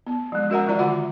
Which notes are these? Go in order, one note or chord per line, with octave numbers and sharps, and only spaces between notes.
B3
F3 G#3
C#4 F#4 A#4 E5 F#5 A#5
D#3 G3 F4 D5 A#5
D3 F4 F#4 E5 F#5 D6